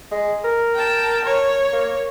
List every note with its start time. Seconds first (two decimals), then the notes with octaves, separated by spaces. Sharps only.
0.12 G#3
0.44 A#4
0.75 G5 A5
1.24 C#5
1.73 A#3